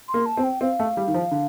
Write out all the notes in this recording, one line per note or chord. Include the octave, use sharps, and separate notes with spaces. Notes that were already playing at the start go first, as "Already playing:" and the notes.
C6
A#3
A5
C4
G5
C4 F5
A3
G3
D#3
F3
D3